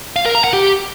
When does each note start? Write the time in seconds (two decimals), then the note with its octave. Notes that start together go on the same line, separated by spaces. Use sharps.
0.16 F5
0.26 A#4
0.35 A#5
0.44 F#5
0.53 G4